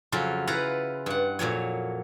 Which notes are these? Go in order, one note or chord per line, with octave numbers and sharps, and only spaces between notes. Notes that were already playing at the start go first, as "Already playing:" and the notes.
F2 C#3 F#3 F4
E4 F4 B4 F#5 A#5
G2 F#5
F2 A#2 F#3 C#5